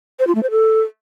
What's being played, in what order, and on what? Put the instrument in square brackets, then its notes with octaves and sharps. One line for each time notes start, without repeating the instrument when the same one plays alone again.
[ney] C5
F4
A3
C5
A4